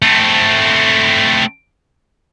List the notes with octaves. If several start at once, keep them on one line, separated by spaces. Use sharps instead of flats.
A3 C4